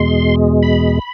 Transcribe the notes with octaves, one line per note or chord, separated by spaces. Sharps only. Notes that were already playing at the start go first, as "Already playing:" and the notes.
Already playing: E2 B2 G#3 C6
B5